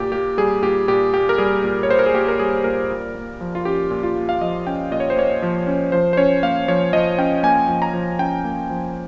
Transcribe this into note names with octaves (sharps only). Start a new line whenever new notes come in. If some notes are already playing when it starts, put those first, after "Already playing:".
Already playing: A#2 G4
A#3 G4
G3 G#4
A#2 G4
A#2 G4
A#3 G4
A#4
G3 G#4
A#2
C#5
A#2 C5
A#4
G#4
A#3 G4
A#4
G3 G#4
A#2 A#4
A#2
A#3
F3
F4
C#4 G4
A#2
F4
A#3
F5
F3 D#5
C#4 G5
A#2 D#5
C#5
C5
A#3 C#5
F3
C#4
F3 C5
C5
C#4 C#5
A#3 F5
F3 C#5
F3 D#5
C#4 G5
A#3 G#5
F3
A#5
F3
C#4 G5
A#3
F3